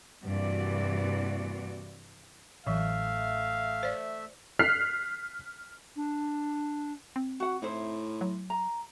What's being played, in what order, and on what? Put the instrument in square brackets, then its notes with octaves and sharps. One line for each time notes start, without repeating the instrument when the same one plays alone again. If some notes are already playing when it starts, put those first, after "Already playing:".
[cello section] G2 C3 E3 A#3 F#4 D5
[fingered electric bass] A1 [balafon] E3 F#3 [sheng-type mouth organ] A3 E5 [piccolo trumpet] F5
[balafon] C5 D5
[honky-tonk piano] F6 F#6 B6 C7
[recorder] D4
[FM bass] C4
[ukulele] F#4 F#5
[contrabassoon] A2 [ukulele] D#4 E4 C5
[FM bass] F#3
[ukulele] A#5